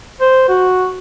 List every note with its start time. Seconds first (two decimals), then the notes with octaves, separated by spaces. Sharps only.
0.21 C5
0.49 F#4